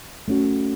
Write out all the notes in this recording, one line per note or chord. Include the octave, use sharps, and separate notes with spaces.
A3 C#4 F#4